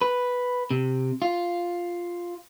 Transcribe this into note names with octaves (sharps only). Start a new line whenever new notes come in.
B4
C3
F4